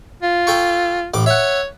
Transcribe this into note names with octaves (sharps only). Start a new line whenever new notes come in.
F4
A4 G5 C#6
A1 A2 D6
C#5 E5 F#5